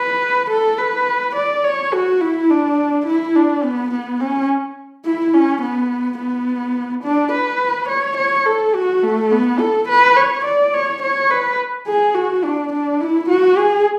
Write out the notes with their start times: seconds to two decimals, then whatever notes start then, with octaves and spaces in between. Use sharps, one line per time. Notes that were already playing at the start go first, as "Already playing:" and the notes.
Already playing: B4
0.51 A4
0.78 B4
1.36 D5
1.64 C#5
1.93 F#4
2.21 E4
2.50 D4
3.06 E4
3.35 D4
3.64 B3
3.92 B3
4.20 C#4
5.05 E4
5.34 C#4
5.62 B3
6.18 B3
7.04 D4
7.32 B4
7.89 C#5
8.17 C#5
8.46 A4
8.75 F#4
9.03 A3
9.31 B3
9.60 A4
9.89 B4
10.16 C#5
10.45 D5
10.74 C#5
11.02 C#5
11.31 B4
11.87 G#4
12.15 F#4
12.44 D4
12.73 D4
13.01 E4
13.29 F#4
13.57 G#4